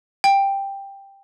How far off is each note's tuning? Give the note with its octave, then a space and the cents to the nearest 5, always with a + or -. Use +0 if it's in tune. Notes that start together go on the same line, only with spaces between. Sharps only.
G5 +10